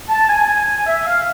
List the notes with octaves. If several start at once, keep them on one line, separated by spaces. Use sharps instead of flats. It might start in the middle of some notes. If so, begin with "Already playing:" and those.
A5
G#5
G#5
G#5
E5
F5